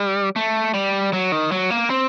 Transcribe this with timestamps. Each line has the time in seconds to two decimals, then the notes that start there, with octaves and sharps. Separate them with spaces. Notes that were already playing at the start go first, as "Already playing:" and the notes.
Already playing: G3
0.36 A3
0.74 G3
1.13 F#3
1.32 D#3
1.52 F#3
1.71 A#3
1.90 C4